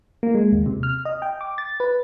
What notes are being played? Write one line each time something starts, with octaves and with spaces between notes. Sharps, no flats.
A#3
G#3
D#2
C3
F6
D#5
G5
D6
A6
B4